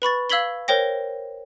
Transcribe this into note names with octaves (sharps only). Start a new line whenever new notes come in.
B4 B5 C#6 A6
F5 E6 G#6 B6 F#7 G7
A#4 C5 C#5 G5 A#6